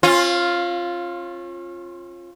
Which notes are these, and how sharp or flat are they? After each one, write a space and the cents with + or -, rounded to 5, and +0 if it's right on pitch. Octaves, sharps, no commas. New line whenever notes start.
C#4 -40 F4 +0